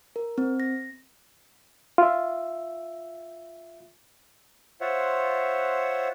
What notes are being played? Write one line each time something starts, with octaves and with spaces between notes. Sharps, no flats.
A#4
C4
A#6
F4 E5
F4 C5 C#5 E5 F#5